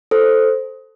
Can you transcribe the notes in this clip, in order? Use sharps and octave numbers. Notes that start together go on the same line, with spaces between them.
A4 C5